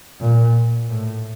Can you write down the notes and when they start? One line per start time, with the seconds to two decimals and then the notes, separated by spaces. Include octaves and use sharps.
0.20 A#2
0.89 A2